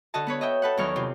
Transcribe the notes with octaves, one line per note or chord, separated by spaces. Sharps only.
D3 F#4 A4 D#5 A5
B3 B4 C#5
D#5 E5 G5
A4 B4 F#5
E2 D#3 F#3 C#6 F6
C3 F4